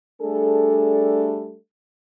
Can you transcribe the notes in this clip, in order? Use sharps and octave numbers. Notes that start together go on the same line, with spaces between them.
G3 A3 D4 G#4 A4